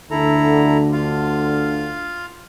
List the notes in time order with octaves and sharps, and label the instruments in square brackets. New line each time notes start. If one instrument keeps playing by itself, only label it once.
[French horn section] D2 D3 [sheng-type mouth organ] E4 A4 A#5
[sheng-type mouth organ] F4 F5